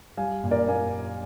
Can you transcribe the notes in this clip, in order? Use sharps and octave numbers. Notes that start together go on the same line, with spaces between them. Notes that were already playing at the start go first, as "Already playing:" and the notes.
G3 F5 G#5
A#2
A#4 D5
A#3 F5 G#5